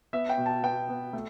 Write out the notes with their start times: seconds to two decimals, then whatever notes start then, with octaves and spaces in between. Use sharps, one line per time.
0.13 B3 E5
0.29 G5
0.38 B2
0.46 A5
0.63 B3 G5
0.89 B3
1.13 A3